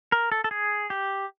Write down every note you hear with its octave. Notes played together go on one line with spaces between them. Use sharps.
A#4
A4
A4
G#4
G4